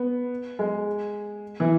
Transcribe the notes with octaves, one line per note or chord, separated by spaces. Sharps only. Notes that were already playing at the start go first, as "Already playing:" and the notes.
Already playing: B3
G#3
E3